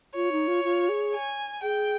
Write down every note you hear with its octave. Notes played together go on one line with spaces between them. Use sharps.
F4 C#5
D#4
F4
F4
G#4
G#5
G#4 G5